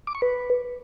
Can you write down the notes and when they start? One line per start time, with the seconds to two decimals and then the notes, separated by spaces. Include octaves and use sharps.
0.07 D6
0.15 C#6
0.22 B4